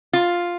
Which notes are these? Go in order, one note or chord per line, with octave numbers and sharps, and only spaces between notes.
F4